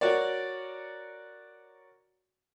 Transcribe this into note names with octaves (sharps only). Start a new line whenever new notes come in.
F#4 A#4 C#5 D5